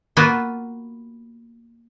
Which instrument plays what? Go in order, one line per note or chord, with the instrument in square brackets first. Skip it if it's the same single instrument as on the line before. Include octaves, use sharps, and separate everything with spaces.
[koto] A#3 B3 F4 F#4